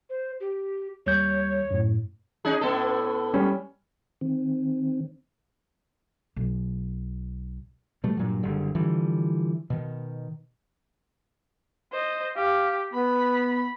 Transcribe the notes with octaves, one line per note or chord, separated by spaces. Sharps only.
C5
G4
D#2 G3 C#5 G6
F#2 A2
C#4 D#4 G#4
A2 B3 A4
G3 C#4
D#3 C4
B1
B2 G3 A3
G2 A#2 F#3
F#1 D3 G3
D3 E3 F3 G3
B2 D#3
C5 D#5
G4 F5
B3 B5